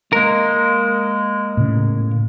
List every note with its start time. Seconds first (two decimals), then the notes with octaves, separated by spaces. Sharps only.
0.13 G#3 A#3 A#4
1.57 A2 C#3